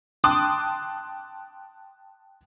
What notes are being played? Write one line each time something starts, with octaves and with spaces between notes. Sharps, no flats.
G5 A5 C6 D6 D#6 F#6